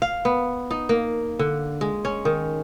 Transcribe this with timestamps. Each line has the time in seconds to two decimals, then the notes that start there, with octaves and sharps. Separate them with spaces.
0.02 F5
0.25 B3
0.71 D#4
0.89 A#3
1.39 D3
1.81 G#3
2.05 C#4
2.25 D#3